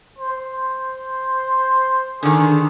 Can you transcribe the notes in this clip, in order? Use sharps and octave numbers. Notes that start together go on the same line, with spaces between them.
C5
D3 D#3 G#4